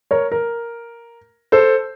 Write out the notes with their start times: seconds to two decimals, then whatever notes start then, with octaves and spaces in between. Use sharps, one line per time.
0.11 A#4 C#5
0.32 A#4
1.52 A4 C5